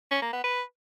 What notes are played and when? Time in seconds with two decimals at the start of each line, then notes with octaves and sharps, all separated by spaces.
0.11 C#4
0.22 A#3
0.33 B3
0.44 B4